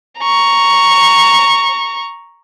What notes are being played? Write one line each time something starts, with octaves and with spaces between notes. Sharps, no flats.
A#5 C#6